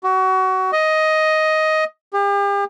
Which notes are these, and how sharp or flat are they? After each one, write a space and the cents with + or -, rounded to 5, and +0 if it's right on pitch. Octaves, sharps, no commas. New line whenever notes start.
F#4 +25
D#5 +10
G4 +40